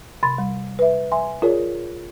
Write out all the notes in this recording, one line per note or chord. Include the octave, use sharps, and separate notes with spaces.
C3 B5 C6 A6
G3
B4 E5
E5 G#5 C6
F4 G#4 A#4 C#5 D5